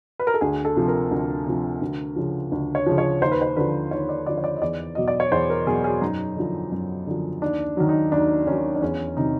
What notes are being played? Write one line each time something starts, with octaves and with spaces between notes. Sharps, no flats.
B4
A#4
A4
D2 G#4
A4
C3 F3
A#4
D2
C3 F3
D2
C#3 F3
D2
C#5
C#3 F3
C#5
D#2 C5
B4
C5
D3 F3 B4
D#2 C#5
D5
D3 F3 D5
C#5
D5
D#5
E2 D5
B2 F#3 D#5
D5
C#5
E2 C5
A#4
B2 F#3 G#4
G#4
F#2 D#4
D3 F3
F#2
D3 F3
D#2 D4
D#3 F#3
D#4
D#2 D4
D#3 F#3 C#4
D4
E2 C#4
C3 D#3 F#3 D#4